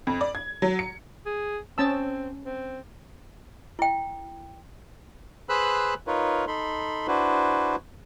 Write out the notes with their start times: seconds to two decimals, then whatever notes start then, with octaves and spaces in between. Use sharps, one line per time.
0.07 F2
0.21 D5
0.35 G#6
0.62 F#3
0.79 C#7
1.26 G#4
1.78 C4 C#4 A5 E6
2.45 C4
3.79 E4 G5
5.49 G#4 B4 C5 B5 E6 F#6
6.07 D#4 F4 A#4 B4 C#5
6.47 D#4 A4 B5 C6
7.08 D4 E4 F#4 B4 C5